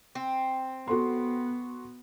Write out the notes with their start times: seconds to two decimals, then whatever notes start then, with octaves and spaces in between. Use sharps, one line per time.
0.15 C4
0.88 B3 F#4 A4 C6